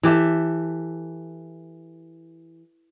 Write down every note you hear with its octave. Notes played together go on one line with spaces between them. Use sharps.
E3 G4 A4 E5